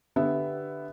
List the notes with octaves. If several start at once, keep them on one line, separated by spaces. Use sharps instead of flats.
D3 B3 G4 E5